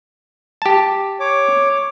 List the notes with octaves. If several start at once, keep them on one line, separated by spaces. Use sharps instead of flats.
G4 A5
C#5 D6